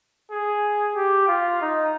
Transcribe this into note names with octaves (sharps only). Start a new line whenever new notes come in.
G#4
G4
F4
D#4